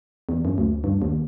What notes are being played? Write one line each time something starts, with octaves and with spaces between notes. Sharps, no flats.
E2
F#2
D2
G2
D#2